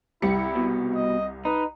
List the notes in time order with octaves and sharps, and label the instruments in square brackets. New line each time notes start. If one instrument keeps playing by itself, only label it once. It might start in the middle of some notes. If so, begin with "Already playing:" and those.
[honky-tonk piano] C2 C#7 [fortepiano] G3 [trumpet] E4
[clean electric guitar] B2
[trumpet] D#5
[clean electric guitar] D#4 [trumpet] B4